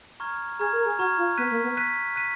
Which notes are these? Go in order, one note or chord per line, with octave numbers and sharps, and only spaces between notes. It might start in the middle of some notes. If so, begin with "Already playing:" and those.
A#5 C#6 F6 G#6
G#4 A#5 C#6 F6 G#6
A#4
G#4
F#4 A#5 C#6 F6 G#6
F4
B3 F#6 B6 D#7
A#3
B3
F#6 B6 D#7
F#6 B6 D#7